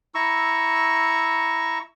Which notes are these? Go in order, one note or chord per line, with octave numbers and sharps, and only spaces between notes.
E4 A#5 C#6 E6